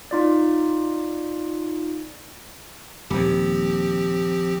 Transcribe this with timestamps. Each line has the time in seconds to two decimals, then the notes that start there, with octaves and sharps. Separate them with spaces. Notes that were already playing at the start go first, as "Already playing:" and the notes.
0.11 D#4 F4 D5
3.10 D#1 D#2 F3 C4 G4